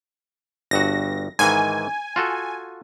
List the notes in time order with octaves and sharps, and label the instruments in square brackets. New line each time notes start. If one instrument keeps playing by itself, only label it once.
[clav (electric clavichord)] G1 G2 F#4 [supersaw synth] A#6
[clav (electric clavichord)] G#2 D#3 E3 [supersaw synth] G#5
[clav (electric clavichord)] F4 F#4 A4